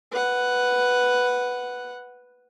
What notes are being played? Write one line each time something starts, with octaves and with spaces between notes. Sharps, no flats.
B4 F#5